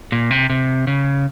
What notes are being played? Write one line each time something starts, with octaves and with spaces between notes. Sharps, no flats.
A#2
C3
C3
C#3